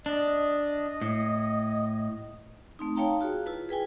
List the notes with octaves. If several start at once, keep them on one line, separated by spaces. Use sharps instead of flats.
D4 D#5
A2
A3 C4 D#4
D#4 C#5 F5 G5 A5 A#5
F4 F#4 G#4
E4 F4 B4
G#4 B4 G5 G#5